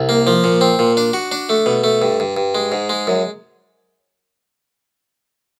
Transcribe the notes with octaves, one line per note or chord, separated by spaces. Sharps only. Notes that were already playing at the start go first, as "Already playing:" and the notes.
Already playing: C2
A#3
F3
A#2
C4
A#2
D4
F#4
D4
A3
B2
A3
G2
G2
G2
G#3
G#2
G#3
F#2